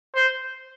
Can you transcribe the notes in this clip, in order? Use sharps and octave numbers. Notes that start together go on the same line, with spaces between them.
C5